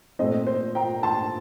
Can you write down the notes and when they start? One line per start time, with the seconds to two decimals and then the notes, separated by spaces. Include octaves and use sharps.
0.19 A#2 A3 C4 C5 D#5
0.47 C5
0.75 G5 A#5
1.03 A5 C6